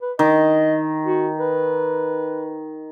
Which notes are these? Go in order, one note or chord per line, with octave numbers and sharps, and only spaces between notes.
B4
D#3 D#5
F#4
B4